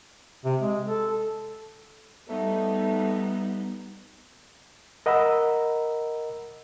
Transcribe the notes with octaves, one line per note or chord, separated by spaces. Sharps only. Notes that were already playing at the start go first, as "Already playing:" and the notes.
C3
G#3
A4
G3 A3 B3 D#4
A#4 D#5 F#5 A#5 B5 E6